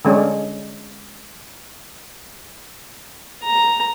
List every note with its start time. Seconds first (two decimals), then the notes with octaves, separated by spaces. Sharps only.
0.05 D3 G#3 C#4 D4
3.43 A#5